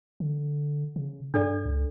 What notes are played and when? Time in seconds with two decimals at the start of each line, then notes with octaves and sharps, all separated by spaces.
0.20 D3
0.96 C#3
1.34 G2 D4 A4 D5
1.66 C#2